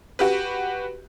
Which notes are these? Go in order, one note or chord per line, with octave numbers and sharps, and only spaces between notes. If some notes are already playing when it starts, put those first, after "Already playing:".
F#4 G4 B4